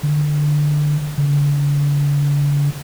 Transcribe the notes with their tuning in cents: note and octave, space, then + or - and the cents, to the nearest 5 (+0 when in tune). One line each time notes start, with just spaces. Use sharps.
D3 +10
D3 -40